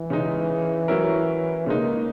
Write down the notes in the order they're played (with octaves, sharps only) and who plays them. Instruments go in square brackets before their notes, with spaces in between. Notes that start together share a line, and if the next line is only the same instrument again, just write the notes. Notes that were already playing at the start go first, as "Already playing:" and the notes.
Already playing: [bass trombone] E3
[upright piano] C#3 G#3 D#4
F#3 C#4 E4 A#4
[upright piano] C#3 G#3 D#4 [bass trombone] A#3